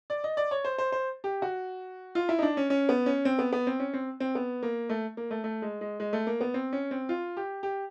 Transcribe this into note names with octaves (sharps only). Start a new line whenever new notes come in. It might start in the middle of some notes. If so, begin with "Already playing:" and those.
D5
D#5
D5
C#5
C5
C5
C5
G4
F#4
F4
E4
D#4
D4
C#4
C#4
B3
C#4
C4
B3
B3
C4
C#4
C4
C4
B3
A#3
A3
A#3
A3
A3
G#3
G#3
G#3
A3
A#3
B3
C4
C#4
C4
F4
G4
G4